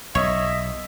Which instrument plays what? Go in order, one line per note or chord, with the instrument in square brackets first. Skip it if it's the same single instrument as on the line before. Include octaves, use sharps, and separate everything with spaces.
[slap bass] B1 [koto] C#5 [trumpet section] D#5 E5